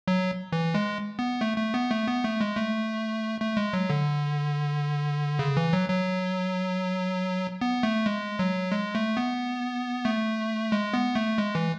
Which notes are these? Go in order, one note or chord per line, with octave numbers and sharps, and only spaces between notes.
F#3
E3
G#3
B3
A3
A3
B3
A3
B3
A3
G#3
A3
A3
G#3
F#3
D3
C#3
E3
F#3
F#3
B3
A3
G#3
F#3
G#3
A3
B3
A3
G#3
B3
A3
G#3
E3